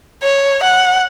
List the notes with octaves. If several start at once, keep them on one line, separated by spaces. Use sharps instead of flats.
C#5
F#5